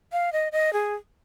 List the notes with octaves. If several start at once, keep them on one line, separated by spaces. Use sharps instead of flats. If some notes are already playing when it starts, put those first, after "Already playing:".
F5
D#5
D#5
G#4